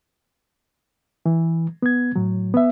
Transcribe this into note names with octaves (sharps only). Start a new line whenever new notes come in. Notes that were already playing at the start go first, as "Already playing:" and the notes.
E3
B3 G#6
A2 F#3
B3 E5